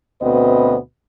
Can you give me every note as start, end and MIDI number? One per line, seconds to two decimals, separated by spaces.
0.21 0.76 38
0.21 0.76 47
0.21 0.76 59
0.21 0.76 60
0.21 0.76 71
0.21 0.76 75